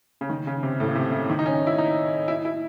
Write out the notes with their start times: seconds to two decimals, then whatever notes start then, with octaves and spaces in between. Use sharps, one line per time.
0.21 C#3
0.30 D#3
0.47 C#3
0.63 C3
0.80 A2
0.88 C#3
0.95 C3
1.12 C#3
1.30 D#3
1.39 D#4
1.46 C#4
1.67 E4
1.78 D#4
2.28 E4
2.45 E4